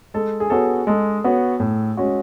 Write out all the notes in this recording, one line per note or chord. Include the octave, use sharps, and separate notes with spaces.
G#3 A4
G#4
B3 F#4 A4 C#5
G#3 A4
B3 F#4 C#5
A2
G#3 C#4 F#4